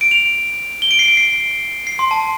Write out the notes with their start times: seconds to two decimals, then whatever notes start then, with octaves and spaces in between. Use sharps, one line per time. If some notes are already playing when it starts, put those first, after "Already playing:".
0.01 D7
0.11 F7
0.82 G7
0.91 D7
0.99 C7
1.08 D7
1.17 C7
1.87 C7
1.99 C6
2.11 A5